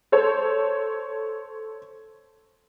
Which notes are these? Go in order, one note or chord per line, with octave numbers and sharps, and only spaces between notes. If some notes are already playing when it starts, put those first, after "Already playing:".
A4 C5 C#5